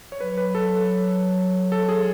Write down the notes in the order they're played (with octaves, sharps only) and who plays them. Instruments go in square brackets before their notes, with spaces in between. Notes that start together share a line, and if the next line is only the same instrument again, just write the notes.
[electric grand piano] C#5
[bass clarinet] F#3 [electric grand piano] B4
[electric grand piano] B4
A4
A4
G#4